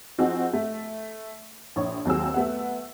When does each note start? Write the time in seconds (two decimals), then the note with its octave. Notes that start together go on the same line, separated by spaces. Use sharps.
0.18 F3 C4 D#4 F#4 G#4
0.53 A3
1.76 A#1 C#5
2.05 D#2 F#3 C4 G#4 E6
2.34 A3 B3 F#5